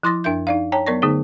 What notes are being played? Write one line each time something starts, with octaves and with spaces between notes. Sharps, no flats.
F3 E4 C6 D#6 A6 A#6
F#2 D4 A#4 E5 G6
D#4 D5 F5
C#5 G5 A5 A#5
F#3 B3 A#4 D5 C#6 A#6
D3 A3 B3 D#4 G#4